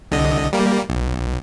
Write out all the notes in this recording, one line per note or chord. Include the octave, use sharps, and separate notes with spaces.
C2 D3 D#5
G3 A#3
B1